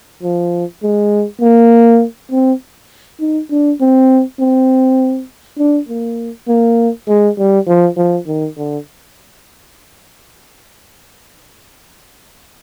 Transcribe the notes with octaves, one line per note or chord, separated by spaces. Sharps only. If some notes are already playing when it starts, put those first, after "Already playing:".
F3
G#3
A#3
C4
D#4
D4
C4
C4
D4
A#3
A#3
G#3
G3
F3
F3
D#3
D3